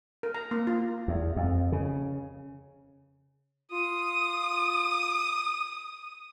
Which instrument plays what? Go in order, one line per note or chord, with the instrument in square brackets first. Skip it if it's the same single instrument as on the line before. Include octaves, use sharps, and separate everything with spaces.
[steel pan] A#4
A#5
A#3
F4
[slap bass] E2
F2
C#3
[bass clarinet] F4 [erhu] D#6